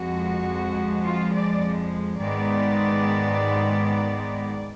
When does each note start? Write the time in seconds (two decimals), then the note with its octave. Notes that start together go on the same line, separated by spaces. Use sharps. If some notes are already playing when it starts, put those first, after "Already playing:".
Already playing: F2 F3 G#3 F#4
1.05 F4
1.33 D5
2.18 G#2 D#3 G#3 B3 D5